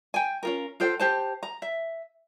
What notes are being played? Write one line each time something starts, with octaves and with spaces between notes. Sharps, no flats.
G5 G#5
C#4 F4 A#4
F4 A4 C5 G5
G4 C5 A5
A#5
E5